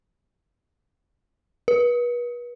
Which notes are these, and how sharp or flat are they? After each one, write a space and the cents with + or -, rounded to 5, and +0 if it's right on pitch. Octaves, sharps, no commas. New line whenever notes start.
B4 -35